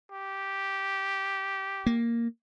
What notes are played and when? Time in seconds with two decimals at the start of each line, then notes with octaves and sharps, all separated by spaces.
0.12 G4
1.86 A#3